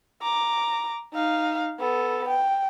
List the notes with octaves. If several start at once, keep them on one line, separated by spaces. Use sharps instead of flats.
A#5 D6
D#4 F5
B3 A4
G5